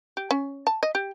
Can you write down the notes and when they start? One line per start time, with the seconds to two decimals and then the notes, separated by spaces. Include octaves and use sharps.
0.17 G4
0.31 C#4
0.67 A5
0.83 D#5
0.95 G4